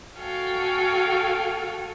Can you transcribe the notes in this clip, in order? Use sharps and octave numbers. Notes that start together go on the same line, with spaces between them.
F#4 A4 F5 G5 G#5